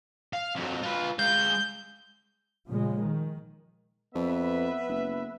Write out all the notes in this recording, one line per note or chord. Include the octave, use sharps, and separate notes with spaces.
F5
F2 F#3
F4 B4
G#3 F5 G6
A#2 C#3 F3 G#3
D#3
F2 B3 B4 E5
F#1